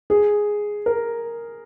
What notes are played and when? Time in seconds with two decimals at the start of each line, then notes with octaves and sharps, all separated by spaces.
0.10 G#4
0.86 A#4